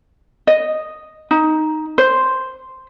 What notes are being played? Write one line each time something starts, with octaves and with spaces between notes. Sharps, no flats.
D#5
D#4
C5